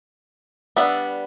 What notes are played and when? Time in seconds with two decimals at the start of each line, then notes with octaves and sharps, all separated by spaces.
0.76 G3 B3 D4 E5